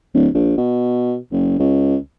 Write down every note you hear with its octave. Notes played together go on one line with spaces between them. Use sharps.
D1
A#1
B2
F#1
C#2